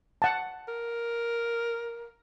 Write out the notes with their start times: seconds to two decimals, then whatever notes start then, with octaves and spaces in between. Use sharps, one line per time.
0.22 F#5 A5
0.68 A#4